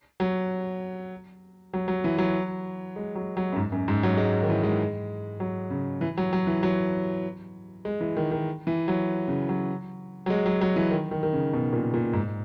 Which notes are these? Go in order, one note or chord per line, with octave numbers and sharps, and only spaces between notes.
F#3
F#3
F#3
E3
F#3
G#3
F#3
F#3
F#2
G#2
F#2
G#2
F#3
G#3
D#3
E3
G#3
F#3
C#3
E3
F#3
F#3
E3
F#3
G#3
E3
D#3
D#3
E3
F#3
C#3
F#3
F#3
G#3
F#3
F#3
E3
D#3
D#3
D#3
C#3
B2
A#2
A#2
G#2